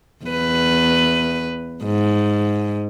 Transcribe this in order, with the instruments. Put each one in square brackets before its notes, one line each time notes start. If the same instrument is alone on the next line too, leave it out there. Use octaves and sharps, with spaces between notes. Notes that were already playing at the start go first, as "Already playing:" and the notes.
[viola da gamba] E2 B4
G#2